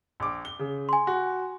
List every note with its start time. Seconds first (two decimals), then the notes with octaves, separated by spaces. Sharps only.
0.20 A#1 D6
0.45 G7
0.59 C#3
0.89 G#5 C6
1.07 F#4